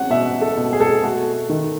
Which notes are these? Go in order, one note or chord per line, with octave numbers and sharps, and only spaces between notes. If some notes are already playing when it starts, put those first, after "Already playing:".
Already playing: C#4 F#5
B2 E5
A4
B2
G#4
A4
G#4
A3 F#4
D#3